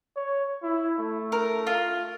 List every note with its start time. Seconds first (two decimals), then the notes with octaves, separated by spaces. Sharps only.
0.16 C#5
0.63 E4
0.98 A3
1.32 A#4
1.67 F4